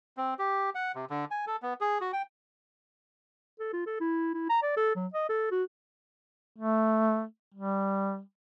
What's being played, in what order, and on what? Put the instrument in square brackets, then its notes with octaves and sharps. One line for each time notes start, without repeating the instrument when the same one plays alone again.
[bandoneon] C4
G4
F#5
C3
D3
G#5
A4
B3
G#4
F#4
G5
[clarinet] A4
F4
A4
E4
E4
A#5
D5
A4
F#3
D#5
A4
F#4
[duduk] A3
G3